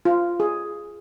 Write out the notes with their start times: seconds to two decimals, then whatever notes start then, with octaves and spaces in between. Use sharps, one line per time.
0.05 F4
0.40 G#4